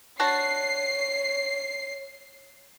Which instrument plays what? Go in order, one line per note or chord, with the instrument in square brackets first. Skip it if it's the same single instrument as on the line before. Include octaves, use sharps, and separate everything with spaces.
[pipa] D4 F#4 A5 [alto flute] C#5 [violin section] C7